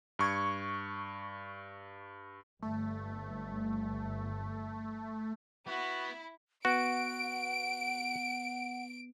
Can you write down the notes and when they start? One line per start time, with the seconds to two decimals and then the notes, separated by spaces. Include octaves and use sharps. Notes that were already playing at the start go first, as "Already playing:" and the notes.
0.19 G2 C#6 G#6
2.62 G1 A3
5.67 B3 E4 F#4 B4 B5
6.65 B3 F#4 F#5 D7